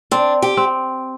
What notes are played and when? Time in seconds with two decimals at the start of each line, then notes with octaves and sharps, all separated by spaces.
0.11 C4 D4
0.42 G4
0.57 C4